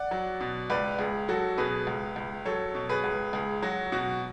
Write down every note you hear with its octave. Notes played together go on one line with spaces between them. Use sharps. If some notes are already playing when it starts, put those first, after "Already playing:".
Already playing: D5 F#5
F#3
B2
C#2 B4 D5
C#2 G#4
F#3 F#4 A4
B2 G#4 B4
C#2
C#2
F#3 A4 C#5
B2
G#4 B4
C#2
C#2 G#4
F#3 F#4
B2 F#4